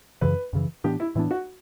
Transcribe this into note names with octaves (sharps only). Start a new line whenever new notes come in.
F#2 C#3 E3 B4
F#2 C#3 E3
A2 E3 B3 D4 G4
E4
A2 E3 B3 D4 E4
F#4